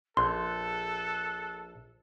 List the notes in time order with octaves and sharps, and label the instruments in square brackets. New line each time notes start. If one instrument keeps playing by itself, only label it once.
[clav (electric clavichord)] A#1 [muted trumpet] A4 [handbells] C6 [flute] F#6